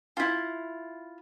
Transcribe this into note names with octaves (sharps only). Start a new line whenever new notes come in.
E4 F4